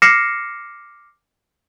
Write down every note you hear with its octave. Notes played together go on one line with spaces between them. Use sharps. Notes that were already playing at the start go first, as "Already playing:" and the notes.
D6 F6 A#6 C7 C#7 E7